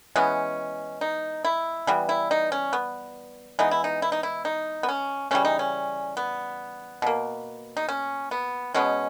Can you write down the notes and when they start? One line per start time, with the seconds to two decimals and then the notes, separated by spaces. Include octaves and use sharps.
0.16 E3 G#3 B3 C#4
1.01 D#4
1.45 E4
1.87 E3 G3 B3
2.09 E4
2.31 D#4
2.52 C#4
2.73 B3
3.59 E3 G#3 B3 D#4
3.71 E4
3.84 D#4
4.02 E4
4.12 D#4
4.23 E4
4.45 D#4
4.83 B3
4.89 C#4
5.31 C#3 E3 G3 C#4
5.45 D#4
5.59 C#4
6.17 B3
7.02 B2 A#3
7.77 D#4
7.89 C#4
8.31 B3
8.74 B2 G#3 B3 C#4